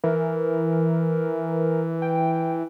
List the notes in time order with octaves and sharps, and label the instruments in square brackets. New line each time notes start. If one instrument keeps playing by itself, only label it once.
[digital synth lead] E3 [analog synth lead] A#4
[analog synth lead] G5